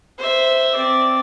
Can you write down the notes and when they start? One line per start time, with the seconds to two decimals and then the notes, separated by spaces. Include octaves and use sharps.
0.18 C5 E5
0.76 C4 D5